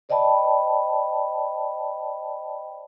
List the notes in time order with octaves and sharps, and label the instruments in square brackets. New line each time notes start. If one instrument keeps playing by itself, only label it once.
[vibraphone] C5 D5 D#5 G5 A5 B5